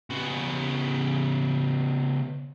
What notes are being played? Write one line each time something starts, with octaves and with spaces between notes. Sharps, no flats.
C#3 B3